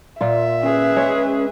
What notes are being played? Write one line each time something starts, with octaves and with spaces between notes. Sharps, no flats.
A#2 F4 E5
C#4 G#4 B4
G#3 C#5